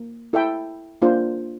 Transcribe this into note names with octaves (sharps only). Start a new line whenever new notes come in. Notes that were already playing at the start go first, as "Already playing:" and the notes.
Already playing: A#3
E4 A4 E5 G5
A#3 D4 F4 C5